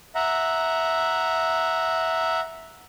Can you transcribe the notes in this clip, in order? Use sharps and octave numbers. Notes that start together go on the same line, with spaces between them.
E5 F#5 A#5